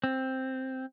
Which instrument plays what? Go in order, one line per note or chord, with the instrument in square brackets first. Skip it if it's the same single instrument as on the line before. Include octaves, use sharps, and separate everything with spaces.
[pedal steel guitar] C4